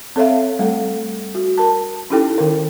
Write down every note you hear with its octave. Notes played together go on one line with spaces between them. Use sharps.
C4 A4 C#5 E5 F5
G3 A3 A4
F#4
A#4 A5
C#4 D#4 E4 G4 A4 G5
D#3 A#4